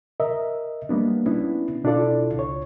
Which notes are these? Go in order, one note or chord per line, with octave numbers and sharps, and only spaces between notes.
A#4 D#5 E5
G3 A#3 B3 D4
B3 C#4 D4 E4
B2 D4 E4 F4 A4 D5
C#2 C#5